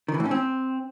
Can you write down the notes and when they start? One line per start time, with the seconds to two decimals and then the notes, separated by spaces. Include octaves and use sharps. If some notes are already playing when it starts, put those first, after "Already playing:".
0.08 D#3
0.14 E3
0.20 A2
0.25 C#4
0.31 C4